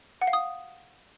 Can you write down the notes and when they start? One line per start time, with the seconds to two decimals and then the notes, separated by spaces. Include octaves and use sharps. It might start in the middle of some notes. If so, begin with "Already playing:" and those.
0.21 F#5
0.27 F5
0.33 D#6